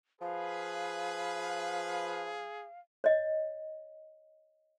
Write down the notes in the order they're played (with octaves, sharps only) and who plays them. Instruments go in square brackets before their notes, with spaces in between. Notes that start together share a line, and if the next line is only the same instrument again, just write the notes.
[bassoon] F3 [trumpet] G#4 [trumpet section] B4 [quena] F5
[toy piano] C#5 D#5